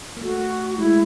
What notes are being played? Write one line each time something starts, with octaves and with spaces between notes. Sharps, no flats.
A#3
A3 F#4
G#3 E4